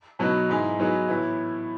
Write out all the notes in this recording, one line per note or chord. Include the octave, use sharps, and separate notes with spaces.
B2 F#3 B3 D#4
G#2 E3 G#3 D#4
F#3 B3 D#4 G#4
A2 E3 B3 E4